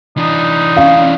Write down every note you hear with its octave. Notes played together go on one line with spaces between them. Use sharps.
E3 D4 D#4
C#4 F5